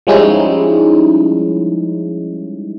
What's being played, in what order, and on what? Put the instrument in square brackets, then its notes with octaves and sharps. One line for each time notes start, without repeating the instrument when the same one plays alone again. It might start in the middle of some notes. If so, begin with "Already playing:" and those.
[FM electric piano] F3 G3 G#3 C#4 D#4 E4